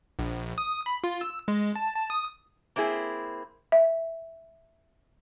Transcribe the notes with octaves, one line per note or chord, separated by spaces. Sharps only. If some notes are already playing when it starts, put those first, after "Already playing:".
A#1
D#6
B5
F4
E6
G#3
A5
A5
D#6
A#3 C4 E4 G#4
E5